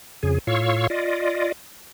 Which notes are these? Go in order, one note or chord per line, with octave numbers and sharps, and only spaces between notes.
F2 C#3 G#4
A2 F4 C#5 F5 C#6 E6
F4 D5 D#5